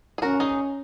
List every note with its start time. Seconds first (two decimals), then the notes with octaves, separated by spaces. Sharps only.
0.18 G#4
0.22 C#4 F#4 A#4
0.40 D#4 G#4